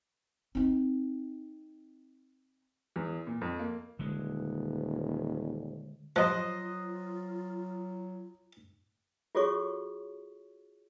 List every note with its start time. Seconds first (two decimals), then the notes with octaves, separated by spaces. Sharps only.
0.55 C4 D#4
2.96 E2
3.27 A#2
3.41 F2
3.59 A#3
3.99 D#1 D3 G#3
6.16 F3 F#3 F4 C5 D#5 F#6
9.35 F4 F#4 G#4 A4 C#5 C#6